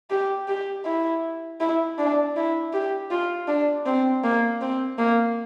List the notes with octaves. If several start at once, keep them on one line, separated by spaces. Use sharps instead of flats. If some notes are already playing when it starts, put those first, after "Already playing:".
G4
G4
E4
E4
D4
E4
G4
F4
D4
C4
A#3
C4
A#3